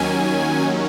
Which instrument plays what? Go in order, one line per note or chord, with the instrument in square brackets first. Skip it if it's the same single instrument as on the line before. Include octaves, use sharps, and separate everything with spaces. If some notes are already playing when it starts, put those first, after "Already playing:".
Already playing: [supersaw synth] D#2 D#3 F#3 C#4 G#5